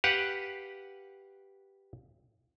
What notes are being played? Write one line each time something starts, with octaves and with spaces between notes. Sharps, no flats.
G4 B4 F5 F#5